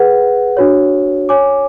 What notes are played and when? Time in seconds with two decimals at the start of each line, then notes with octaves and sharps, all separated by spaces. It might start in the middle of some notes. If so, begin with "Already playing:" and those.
Already playing: G#4 B4 F#5
0.57 D4 F#4 C#5
1.29 C#5 G#5 D6